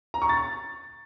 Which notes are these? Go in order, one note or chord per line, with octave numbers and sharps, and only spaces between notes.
A#5
C#6
A6